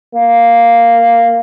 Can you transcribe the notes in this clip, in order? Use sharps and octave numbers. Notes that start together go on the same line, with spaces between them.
A#3